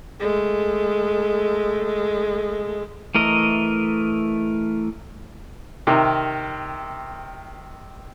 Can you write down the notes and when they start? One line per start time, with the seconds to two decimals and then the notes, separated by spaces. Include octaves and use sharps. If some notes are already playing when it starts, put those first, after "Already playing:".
0.20 G#3 A3
3.15 E3 A3 A#4 D#5
5.87 C3 D#3 A#4